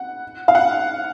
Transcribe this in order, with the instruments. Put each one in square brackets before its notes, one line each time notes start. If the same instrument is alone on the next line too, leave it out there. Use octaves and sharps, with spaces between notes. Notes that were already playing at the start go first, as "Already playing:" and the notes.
Already playing: [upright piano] F#5
F5
F#5